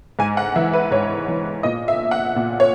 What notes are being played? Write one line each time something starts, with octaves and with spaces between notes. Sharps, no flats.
G#2 G#5
F#5
E3 E5
B4
G#2 C#5
E3
A#2 D#5
E5
F#5
A#2
C#5